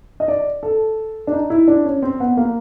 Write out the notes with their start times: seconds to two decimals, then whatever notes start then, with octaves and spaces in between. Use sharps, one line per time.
0.20 D#5
0.28 D5
0.63 A4
1.27 D4
1.33 D#4
1.50 E4
1.68 D4
1.85 C#4
2.02 C4
2.20 B3
2.37 A#3